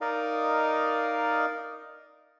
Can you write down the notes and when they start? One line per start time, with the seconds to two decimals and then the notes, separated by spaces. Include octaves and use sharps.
0.01 D#4 A#4 D5 D#5 F5